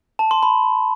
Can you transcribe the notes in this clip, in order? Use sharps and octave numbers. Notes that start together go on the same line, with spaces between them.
A5
C6
B5